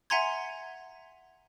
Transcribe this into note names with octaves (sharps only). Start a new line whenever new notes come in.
E5 F#5 G#5 A#5 C6 G#6